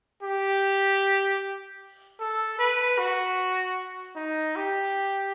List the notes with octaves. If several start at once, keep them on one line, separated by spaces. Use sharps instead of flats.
G4
A4
B4
F#4
D#4
G4